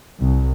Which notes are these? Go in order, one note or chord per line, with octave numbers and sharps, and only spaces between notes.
C2